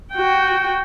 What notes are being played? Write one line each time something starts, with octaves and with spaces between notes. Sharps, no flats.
F#4 G5